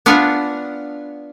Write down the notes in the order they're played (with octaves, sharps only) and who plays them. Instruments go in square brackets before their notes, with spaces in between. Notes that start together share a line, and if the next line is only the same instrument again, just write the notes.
[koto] B3 D4 F4 F5 F#5 G#5